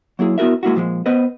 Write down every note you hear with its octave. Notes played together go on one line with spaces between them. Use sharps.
F#3 A#3 E4 G#4
B3 E4 F#4 A#4 E5
G#3 A#3 E4 F#4
A#2 F3 F#3 G#3
B3 B4 C5 D#5